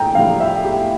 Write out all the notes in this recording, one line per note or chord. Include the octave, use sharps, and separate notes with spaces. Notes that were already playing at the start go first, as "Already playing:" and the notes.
Already playing: A#1 A2 G5 A#5
A#1 A2 G3 F5
E5
G4